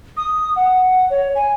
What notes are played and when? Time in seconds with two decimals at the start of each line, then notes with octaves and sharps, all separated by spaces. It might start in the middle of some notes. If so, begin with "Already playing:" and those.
0.17 D#6
0.56 F#5
1.10 C#5
1.35 G#5